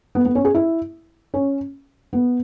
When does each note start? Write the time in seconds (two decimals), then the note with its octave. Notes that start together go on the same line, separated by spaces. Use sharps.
0.15 B3
0.25 B3
0.35 C#4
0.45 G#4
0.55 E4
1.34 C#4
2.13 B3